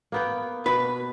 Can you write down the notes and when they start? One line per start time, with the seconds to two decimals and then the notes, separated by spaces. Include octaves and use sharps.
0.12 A#3 B3 G5
0.66 B2 B4